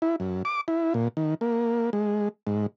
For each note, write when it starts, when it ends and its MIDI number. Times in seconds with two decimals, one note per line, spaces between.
0.02 0.16 64
0.20 0.43 42
0.45 0.61 86
0.68 0.93 64
0.94 1.08 46
1.17 1.34 51
1.41 1.90 58
1.93 2.29 56
2.47 2.66 44